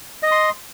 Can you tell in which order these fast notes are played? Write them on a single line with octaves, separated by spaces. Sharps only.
D#5 D#6 C6